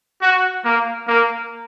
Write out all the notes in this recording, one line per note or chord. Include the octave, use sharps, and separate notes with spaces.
F#4
A#3
A#3